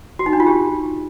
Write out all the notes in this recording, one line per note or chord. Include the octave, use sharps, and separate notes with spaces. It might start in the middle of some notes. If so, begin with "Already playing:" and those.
F#4
D#4
D4
F4
G4